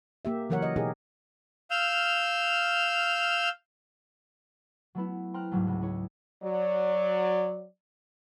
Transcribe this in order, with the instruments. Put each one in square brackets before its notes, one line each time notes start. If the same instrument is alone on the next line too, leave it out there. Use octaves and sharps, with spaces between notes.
[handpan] A#3 G4 E5
C#3 E3 F#3 A#4 C#5 F#5
D#5
B2 D#4 G4 G#4 A#4
[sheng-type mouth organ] F5 E6 F6 G6
[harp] F#3 A3 B3 E4
C5 G5 A#5 C6 F6 F#6
C2 G#2 F#3 A3
C#2
E4 G#4 C#5
[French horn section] F#3 D5